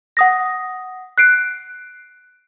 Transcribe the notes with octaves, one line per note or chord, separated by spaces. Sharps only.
F#5 D#6 A#6
F#6 C7 D7